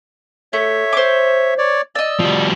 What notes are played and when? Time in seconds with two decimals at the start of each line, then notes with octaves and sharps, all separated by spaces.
0.53 A3 C#5 E5
0.93 C5 D6
1.58 C#5 D5
1.95 D5 D#5 E6
2.19 F3 G3